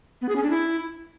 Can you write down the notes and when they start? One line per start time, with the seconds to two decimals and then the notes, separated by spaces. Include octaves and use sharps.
0.21 B3
0.29 G#4
0.36 C#4
0.43 D4
0.50 E4